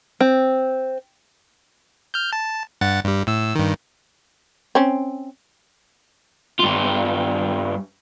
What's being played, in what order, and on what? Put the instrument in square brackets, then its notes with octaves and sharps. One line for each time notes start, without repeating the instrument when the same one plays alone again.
[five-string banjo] C4
[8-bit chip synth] F6 G6
A5
G2 F#5 A6
G2 G3
A2 E6
G2 D#3
[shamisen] C4 C#4
[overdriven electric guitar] G2 F4